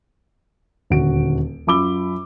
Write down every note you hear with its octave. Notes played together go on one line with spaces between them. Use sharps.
D#1 D2 F#4 D7
F#2 F4 B5 D6 E6 G7